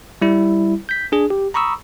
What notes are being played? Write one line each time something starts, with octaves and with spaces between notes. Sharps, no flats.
G3 E4
G6 B6
D4 G#4
G4
A#5 B5 C#6 D#6 E6